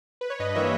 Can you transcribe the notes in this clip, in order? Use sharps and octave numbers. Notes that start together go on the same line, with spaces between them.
B4
C#5
G2 B4 D#5
E3 G3 A#3 C#5 E5